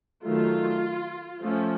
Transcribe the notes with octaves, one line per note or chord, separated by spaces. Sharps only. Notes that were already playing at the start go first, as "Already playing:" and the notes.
D#3 F#3 A3 F4
F3 A3 C#4